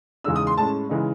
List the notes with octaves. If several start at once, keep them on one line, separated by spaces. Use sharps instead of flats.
E2 C#3 G#3 D#4 E6
D#6
C6
A2 G#3 C#4 A5
C#3 E3 G#3 D#4